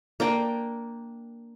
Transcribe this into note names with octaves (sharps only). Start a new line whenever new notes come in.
A#3 D4 G5